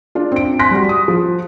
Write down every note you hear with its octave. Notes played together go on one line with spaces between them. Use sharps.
D4 F4
C4 D7
G#5 C6 F#6 A#6 B6
G3 F#4
D#6
F3